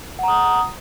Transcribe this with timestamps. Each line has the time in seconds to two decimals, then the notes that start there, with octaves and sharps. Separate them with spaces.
0.19 F#5
0.23 A#5
0.28 D#6